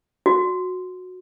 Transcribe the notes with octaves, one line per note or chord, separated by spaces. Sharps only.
F#4